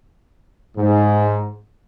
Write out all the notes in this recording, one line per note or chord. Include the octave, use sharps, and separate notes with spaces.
G#2